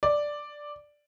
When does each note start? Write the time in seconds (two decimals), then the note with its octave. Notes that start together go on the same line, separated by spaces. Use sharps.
0.03 D5